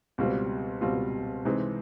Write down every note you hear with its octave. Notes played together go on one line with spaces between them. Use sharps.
C#2 B2 G3 C4 F4
C#2 B2 G3 C4 F4
C3 E3 G#3 C4 D#4